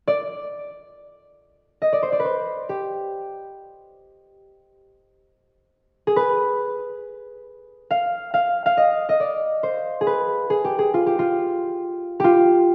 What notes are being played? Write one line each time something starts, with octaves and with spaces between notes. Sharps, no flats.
D5
D#5
D5
C5
D5
B4
C5
G4
G#4
B4
F5
F5
F5
D#5
D#5
D5
C5
G#4
B4
G#4
G4
G#4
F4
G4
F4
F4 G4